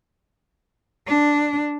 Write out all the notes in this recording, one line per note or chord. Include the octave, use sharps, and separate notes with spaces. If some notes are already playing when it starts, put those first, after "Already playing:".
D4